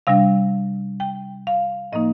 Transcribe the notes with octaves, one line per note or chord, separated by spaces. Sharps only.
C3 G3 D4 F5
G5
F5
A2 F3 A#3 D#4 D#5